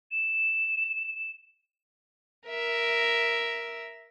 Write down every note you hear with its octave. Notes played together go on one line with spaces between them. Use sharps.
E7
A#4 E5